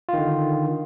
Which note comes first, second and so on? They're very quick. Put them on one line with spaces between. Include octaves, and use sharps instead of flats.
F4 D#3 D3